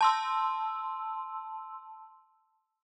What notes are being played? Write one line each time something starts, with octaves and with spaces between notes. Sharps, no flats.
A5 C6 E6